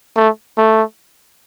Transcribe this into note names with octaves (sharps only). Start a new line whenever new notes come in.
A3
A3